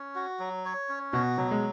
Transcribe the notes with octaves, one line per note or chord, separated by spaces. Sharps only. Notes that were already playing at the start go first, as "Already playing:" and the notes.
Already playing: C#4
F#4
F#3
C#5
C#4
B2 F#4
B2 F#3
G#3